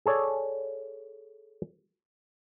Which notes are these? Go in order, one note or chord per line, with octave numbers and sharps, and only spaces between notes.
G#4 A4 C#5 D5